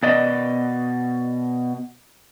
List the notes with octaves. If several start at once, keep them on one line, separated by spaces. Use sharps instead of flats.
B2 D5 D#5